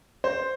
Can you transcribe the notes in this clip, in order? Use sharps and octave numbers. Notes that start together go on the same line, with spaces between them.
C5